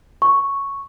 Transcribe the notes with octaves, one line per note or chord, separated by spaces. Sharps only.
C#6